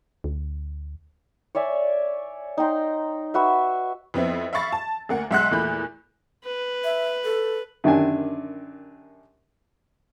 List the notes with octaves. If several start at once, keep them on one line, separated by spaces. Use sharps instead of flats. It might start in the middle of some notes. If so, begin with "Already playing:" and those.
D2
C#5 D5 E5 G#5
D#4 G5 A#5 C6
F#4 B4 E5
F2 B3 C4 E4
E5 F5 B5 C#6 A6
A5
D2 A#3 F#5
B1 G#3 E5 F#5 C6 F#6
E2 A#2 A3 B5 G6
B4
E5
A4
F#2 D3 D#3 D4 G4 G#5